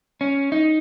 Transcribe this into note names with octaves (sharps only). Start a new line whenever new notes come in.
C#4
D#4